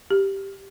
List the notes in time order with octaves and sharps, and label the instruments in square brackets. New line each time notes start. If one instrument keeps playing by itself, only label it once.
[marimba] G4